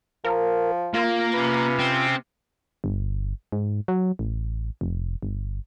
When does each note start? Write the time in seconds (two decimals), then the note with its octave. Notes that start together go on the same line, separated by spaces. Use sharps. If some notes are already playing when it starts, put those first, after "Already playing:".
0.24 F3 A#4
0.94 A#3 F4
1.33 C3 C#4 B4
1.79 C4
2.84 G1
3.52 G#2
3.88 F#3
4.19 A1
4.81 F1
5.23 G1